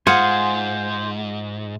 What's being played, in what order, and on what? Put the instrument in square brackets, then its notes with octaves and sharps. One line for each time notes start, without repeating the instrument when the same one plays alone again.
[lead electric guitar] G#2 [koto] F4 G#4 [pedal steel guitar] C5 G#5 [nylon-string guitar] F#5